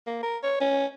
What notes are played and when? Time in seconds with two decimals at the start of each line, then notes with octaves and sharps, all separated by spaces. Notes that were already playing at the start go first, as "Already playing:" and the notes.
0.07 A#3
0.23 A#4
0.43 C#5
0.61 C#4